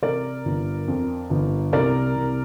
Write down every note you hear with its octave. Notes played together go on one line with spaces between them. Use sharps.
C3 A#4 D5
G1
F2
G1
C2 A#4 D5
C2